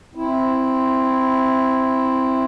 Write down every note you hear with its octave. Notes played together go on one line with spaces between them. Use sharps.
C4 E4